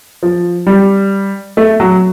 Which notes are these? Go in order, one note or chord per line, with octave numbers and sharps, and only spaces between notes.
F3
G3
A3
F#3